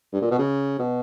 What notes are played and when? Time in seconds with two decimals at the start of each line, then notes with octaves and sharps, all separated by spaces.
0.13 G2
0.22 A#2
0.31 B2
0.38 C#3
0.79 B2